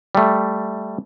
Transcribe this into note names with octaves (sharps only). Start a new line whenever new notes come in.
G3 A3